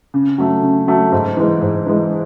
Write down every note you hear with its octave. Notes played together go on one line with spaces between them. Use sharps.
C#3
F#3 A3
C#3
F#3 A3
G#2
E3 G#3
G#2
E3 G#3